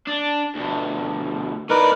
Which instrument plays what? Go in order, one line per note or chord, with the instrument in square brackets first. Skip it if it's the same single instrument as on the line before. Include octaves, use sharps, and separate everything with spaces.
[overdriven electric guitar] D4
D2 B2
[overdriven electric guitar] A2 D5 [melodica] D#4 A#4 B4